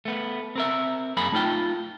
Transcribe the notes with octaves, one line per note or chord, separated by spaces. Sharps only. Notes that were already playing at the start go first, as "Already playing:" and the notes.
A3 B3
C4 A#4 E5
F#2 A#3 G#4 B5
A3 D#4 F4 G5